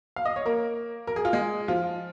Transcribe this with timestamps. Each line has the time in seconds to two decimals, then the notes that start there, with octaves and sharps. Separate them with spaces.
0.16 F5
0.25 D#5
0.36 C#5
0.46 A#3 A#4
1.07 A#4
1.16 G#4
1.25 F4
1.33 G#3 G#4
1.68 F3 F4